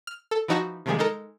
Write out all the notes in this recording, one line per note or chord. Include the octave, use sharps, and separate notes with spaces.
F6
A4
E3 F3 D#4 F#4 A5 A#6
C3 D#3 F3 G3 G#3 G#4
G#3 D#4 A4 A#4